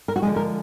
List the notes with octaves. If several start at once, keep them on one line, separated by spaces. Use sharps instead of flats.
A#4
F#4
D3 F3 G#3 G#4
A#4